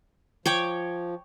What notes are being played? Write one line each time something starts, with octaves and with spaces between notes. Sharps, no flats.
F3 C#5 G5 D6